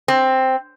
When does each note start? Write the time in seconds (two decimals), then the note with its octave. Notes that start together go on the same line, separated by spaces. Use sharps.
0.08 C4